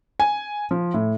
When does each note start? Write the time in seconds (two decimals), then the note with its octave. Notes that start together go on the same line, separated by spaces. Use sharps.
0.20 G#5
0.71 F3
0.94 A2